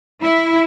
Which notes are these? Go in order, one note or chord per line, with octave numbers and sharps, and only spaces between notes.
E4